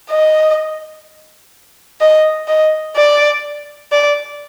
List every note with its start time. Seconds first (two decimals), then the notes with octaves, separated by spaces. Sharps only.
0.10 D#5
2.01 D#5
2.48 D#5
2.96 D5
3.92 D5